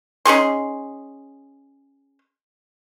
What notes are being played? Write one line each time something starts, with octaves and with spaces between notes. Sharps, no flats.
C#4 D#4 G#4 C6